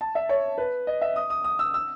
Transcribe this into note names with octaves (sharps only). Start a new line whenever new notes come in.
A5
E5
C#5
B4
D#5
E5
D#6
D#6
D#6
E6
E6